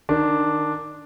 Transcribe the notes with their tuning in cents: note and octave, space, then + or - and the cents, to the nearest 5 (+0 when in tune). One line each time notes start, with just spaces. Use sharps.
D#3 -20 D4 +0